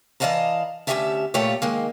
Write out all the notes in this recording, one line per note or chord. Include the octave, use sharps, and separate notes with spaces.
E3 D5 D#5 F5 A5 A#5
D2 A3 C#4 G4 E5 A5
A#2 A3 F4 G4 C#5
D#3 G#3 A#3